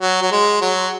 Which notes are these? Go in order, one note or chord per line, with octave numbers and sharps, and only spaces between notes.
F#3
F#3
G#3
F#3